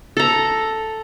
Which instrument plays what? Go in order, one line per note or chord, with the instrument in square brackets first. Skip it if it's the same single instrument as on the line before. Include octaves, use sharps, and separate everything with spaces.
[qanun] A4 A#5